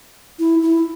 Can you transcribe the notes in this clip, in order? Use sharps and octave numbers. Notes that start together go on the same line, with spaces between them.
E4
E4